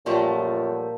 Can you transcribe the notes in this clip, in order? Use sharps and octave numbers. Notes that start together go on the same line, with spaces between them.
F#2 A#2 F3 G3 A3 A5